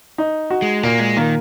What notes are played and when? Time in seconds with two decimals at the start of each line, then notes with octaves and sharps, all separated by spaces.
0.18 D#4
0.50 F#4
0.62 G#3
0.83 A#2 A#3
1.00 G#3
1.17 D#3 A#3